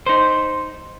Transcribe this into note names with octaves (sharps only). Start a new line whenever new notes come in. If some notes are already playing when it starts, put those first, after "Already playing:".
D#4 C5